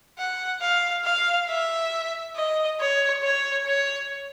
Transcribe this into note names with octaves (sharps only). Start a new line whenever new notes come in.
F#5
F5
F5
E5
D#5
C#5
C#5
C#5